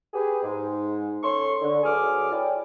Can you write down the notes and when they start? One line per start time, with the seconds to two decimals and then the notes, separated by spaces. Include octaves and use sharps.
0.14 G4 G#4 B4
0.43 G#2
1.22 C#4 A4 C#5 C6 C#6
1.61 D3
1.83 D2 G2 F#3 G#4 D6 F6
2.32 E4 G#4 C#5 D5 G5